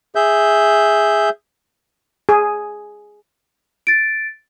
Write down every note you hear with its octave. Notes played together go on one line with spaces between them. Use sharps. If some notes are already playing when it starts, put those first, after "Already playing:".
G#4 E5 G6
G#4
A6 D7